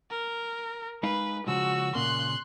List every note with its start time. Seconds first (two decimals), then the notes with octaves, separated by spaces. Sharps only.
0.10 A#4
1.03 G#3 D#4 B4 F5
1.47 C#3 F3 G#3 F#4 E6
1.95 A#2 C#3 A#3 C6 F#6